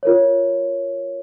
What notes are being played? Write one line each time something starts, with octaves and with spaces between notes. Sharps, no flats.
F4 A#4 C#5